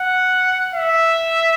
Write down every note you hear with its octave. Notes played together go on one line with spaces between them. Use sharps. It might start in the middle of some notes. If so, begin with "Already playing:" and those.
Already playing: F#5
E5